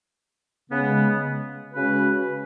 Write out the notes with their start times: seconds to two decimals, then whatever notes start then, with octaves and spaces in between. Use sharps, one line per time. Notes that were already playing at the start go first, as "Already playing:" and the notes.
0.70 C#3 G#3 B3
1.73 C#3 G#3 C#4 F#4 B4